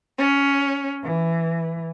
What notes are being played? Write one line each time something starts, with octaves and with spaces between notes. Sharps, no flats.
C#4
E3